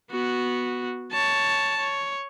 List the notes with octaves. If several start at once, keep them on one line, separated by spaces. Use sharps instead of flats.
B3 F#4
C#5 A5
C#5